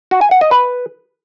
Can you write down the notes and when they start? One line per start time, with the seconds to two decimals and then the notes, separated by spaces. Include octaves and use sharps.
0.11 F#4
0.21 G#5
0.31 F#5
0.41 D#5
0.51 B4